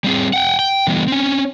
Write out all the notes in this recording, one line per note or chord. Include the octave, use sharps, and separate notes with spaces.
G3 C4 G#4
F#5 G5
G5
D3 E3 G3 B3
C4 C#4